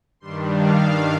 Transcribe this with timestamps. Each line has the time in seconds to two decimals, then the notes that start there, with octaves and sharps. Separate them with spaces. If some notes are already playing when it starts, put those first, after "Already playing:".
0.20 G2 D#3 G3 D4 C6
0.51 F5